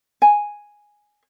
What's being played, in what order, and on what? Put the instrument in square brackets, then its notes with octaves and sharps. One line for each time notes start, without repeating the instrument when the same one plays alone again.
[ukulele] G#5